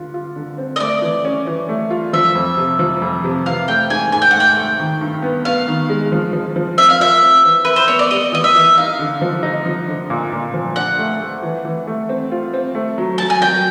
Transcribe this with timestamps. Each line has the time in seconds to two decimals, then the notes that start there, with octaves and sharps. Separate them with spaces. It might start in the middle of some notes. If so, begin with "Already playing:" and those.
Already playing: D3 F4
0.14 F4
0.36 D3
0.58 C4
0.76 D#5
0.80 A3 D5
1.02 E3
1.25 C#4
1.47 E3
1.69 A3
1.90 F4
2.13 F3 E5
2.35 F2
2.57 C3
2.79 F3
3.02 F2
3.24 C3
3.46 E3 F5
3.68 A3 G5
3.90 G#2 G#5
4.12 G#2 G#5
4.22 G5
4.31 A3 F#5
4.40 G5
4.57 A3
4.79 D#3
5.01 G2
5.22 B3
5.45 B3 F5
5.67 D#3
5.90 G#3
6.12 F3
6.33 F3
6.56 F3
6.77 C4 E5
6.90 F5
7.00 F4 E5
7.22 C4
7.44 E3
7.65 E4 B4
7.76 C5
7.88 B3 C#5
7.99 D5
8.11 G3 D#5
8.32 E3 D#5
8.44 E5
8.55 E3
8.77 D#4 F5
8.99 D3
9.22 F3
9.43 D#4
9.66 F3
9.87 D3
10.10 A#2
10.32 A#2
10.54 F3
10.76 D4 F#5
10.98 A3
11.21 A3
11.43 E3
11.65 E3
11.87 A3
12.09 C4
12.32 F4
12.53 C4
12.75 A3
12.98 F#3
13.18 F#3 A5
13.30 G#5
13.41 F#3 G5